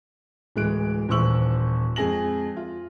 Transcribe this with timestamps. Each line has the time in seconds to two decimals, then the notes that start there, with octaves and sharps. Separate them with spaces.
0.56 D1 E3 G#3 F#6 D7
1.09 D#1 E3 C5 C#6 E6 F#7
1.96 F2 G#3 G#4 A#6 F#7
2.57 F4